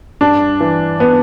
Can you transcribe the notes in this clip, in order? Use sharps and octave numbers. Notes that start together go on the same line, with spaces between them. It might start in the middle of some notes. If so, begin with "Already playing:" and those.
G2 D4
E3
B3